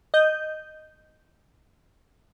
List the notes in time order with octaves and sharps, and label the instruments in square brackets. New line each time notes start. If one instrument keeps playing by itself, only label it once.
[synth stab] D#5 G6